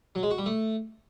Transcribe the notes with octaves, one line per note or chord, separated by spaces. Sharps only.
F#3
G#3
F#4
G3
A3